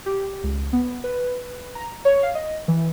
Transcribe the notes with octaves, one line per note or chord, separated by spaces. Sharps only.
G4
C#2
B3
B4
A#5
C#5
F5
D#5
E3